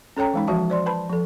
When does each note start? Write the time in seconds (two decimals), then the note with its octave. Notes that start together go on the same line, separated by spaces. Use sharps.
0.17 C#4 A4 C#5 G5 A#5
0.33 E3 G#3 D#4
0.47 E3 F3 F#4 E5 A5
0.70 C5 D5 C6
0.86 B4 A5 B5
1.10 F3 A4